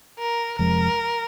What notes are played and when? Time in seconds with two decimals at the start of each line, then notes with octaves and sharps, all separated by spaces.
0.19 A#4
0.59 F1 F2 F3 G#3 A#4